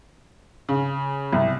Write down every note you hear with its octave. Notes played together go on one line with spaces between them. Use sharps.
C#3
C2